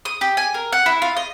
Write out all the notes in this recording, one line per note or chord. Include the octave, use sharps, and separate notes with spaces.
D#6
G4
G#5
A#4
F#5
E4
F4
D#5